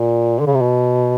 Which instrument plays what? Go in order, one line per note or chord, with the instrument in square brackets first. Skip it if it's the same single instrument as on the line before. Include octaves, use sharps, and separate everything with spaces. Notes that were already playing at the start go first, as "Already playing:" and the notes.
Already playing: [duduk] A#2
D3
C#3
C3
B2